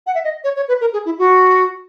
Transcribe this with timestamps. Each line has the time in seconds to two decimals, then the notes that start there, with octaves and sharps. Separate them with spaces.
0.07 F#5
0.15 E5
0.24 D#5
0.44 C#5
0.56 C#5
0.68 B4
0.81 A#4
0.93 G#4
1.06 E4
1.19 F#4